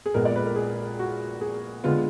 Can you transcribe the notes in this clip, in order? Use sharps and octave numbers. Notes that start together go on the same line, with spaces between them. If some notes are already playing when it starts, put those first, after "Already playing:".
G#4
A#1 A#2 G#3 B3 A#4
D5
B4
A#4
G#4
F#4
G#4
D3 G#3 B3 F4